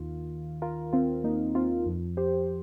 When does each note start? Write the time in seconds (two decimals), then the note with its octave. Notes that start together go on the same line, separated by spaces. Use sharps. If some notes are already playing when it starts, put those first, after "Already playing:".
Already playing: D#2 D#3 F4
0.62 F4 A#4
0.93 C4 F4
1.24 A#3 D#4
1.55 C4 F4
1.86 F2 F3
2.17 G4 C5